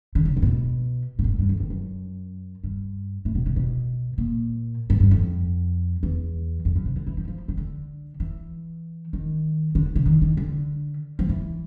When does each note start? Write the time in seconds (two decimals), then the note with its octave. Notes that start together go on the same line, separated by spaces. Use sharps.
0.15 D3
0.25 C#3
0.37 C3
0.42 A#2
0.46 B2
1.19 A#2
1.24 G2
1.28 G#2
1.39 G2
1.49 F2
1.60 F2
1.70 F#2
2.64 G2
3.25 A2
3.35 B2
3.46 C3
3.56 B2
4.18 A#2
4.90 G#2
5.00 G2
5.11 F2
6.03 E2
6.65 F2
6.76 F#2
6.85 C3
6.96 D3
7.07 E3
7.17 F3
7.28 F3
7.48 D#3
7.57 D3
8.20 E3
9.13 D#3
9.75 D3
9.96 C#3
10.06 D#3
10.22 D#3
10.37 D3
11.19 F3
11.29 E3